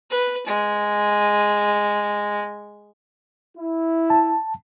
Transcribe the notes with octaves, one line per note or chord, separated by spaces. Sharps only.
B4
G#3
E4
A5